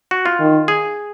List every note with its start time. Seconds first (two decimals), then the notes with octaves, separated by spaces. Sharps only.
0.11 F#4
0.26 F4
0.40 D#3
0.68 G#4